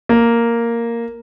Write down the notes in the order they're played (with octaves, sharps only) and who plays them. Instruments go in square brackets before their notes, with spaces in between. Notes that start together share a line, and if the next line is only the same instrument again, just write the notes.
[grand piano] A#3